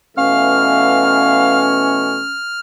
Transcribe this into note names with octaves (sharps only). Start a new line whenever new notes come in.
B2 E3 A3 C#4 F5 F6